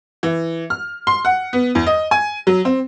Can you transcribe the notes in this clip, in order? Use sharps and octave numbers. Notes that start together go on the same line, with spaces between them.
E3
F6
C6
F#5
B3
E2
D#5
G#5
F#3
C4